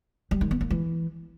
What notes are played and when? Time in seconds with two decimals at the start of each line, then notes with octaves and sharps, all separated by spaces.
0.31 G3
0.41 D#3
0.51 B3
0.61 A#3
0.70 E3